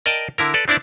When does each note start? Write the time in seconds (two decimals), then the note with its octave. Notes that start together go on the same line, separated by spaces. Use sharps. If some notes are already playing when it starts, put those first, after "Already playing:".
0.06 A#4 D5 D#5 G5 A5
0.38 D3 E4 A#4
0.54 A4 B4 D5
0.68 C4 D4 E4 D5 A5